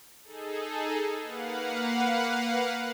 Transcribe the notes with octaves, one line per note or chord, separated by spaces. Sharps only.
D#4 G#4 A4
A#3 B4 F5 F#5